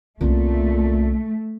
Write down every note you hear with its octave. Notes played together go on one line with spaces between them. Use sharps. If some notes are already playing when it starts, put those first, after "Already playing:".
C2 A#2 C#3 A3